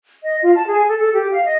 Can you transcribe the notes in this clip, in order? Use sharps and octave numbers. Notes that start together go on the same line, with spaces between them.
D#5
F4
A5
G#4
A4
A4
G4
F5
D#5